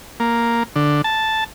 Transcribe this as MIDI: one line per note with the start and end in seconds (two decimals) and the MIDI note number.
0.20 0.63 58
0.76 1.02 50
1.04 1.44 81